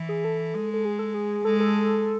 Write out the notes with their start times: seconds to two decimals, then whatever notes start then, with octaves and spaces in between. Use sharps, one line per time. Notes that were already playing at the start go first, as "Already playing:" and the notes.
Already playing: E3
0.09 G#4
0.25 A4
0.54 G#3
0.74 A4
0.85 G#4
0.99 A4
1.14 G#4
1.45 G#3 A4
1.60 A4